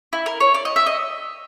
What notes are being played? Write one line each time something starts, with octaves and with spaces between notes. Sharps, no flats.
E4
A#4
C#5
D5
D#5
E5
D#5